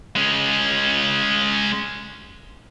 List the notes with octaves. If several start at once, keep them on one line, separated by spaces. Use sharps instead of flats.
G#3 C#4